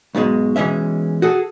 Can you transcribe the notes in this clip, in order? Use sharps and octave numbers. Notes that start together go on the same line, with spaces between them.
B1 G#2 B2 G#3
B2 E3 G#3 C#4 E5
F#4 G#4 A4